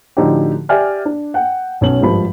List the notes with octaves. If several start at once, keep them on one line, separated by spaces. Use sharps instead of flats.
A2 D3 F3 D#4 F#4 G4
G4 D5 E5 G5 G#5 F6
D4
F#5 G5
B1 C#4 F#7
G#1 G2 F3 B5